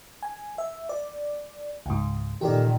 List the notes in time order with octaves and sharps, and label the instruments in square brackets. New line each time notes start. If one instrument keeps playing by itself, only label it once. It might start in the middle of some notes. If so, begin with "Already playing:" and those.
[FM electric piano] G#5
E5
D5
C#2 G#2
[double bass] A#2 D#3 [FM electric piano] G4 A4 D5